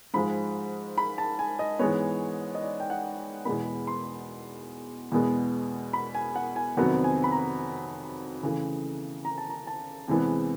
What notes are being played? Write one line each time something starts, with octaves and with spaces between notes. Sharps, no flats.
G#2 F3 G#3 B5
B5
A5
G#5
D#5
G#2 E3 G#3 B3 C#5
D#5
D5
G5
F#5
E2 B2 G#3 B3 B5
C6
E2 B2 G#3 B3
B5
G#5
F#5
G#5
F2 C3 D#3 F#3 B3 F#5
G#5
B5
A#5
C#3 E3 A3
A#5
A5
A#5
A5
E2 C3 E3 G#3 B3